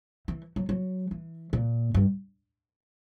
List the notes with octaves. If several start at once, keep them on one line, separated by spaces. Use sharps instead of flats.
E3
F#3
F#3
E3
A#2
G2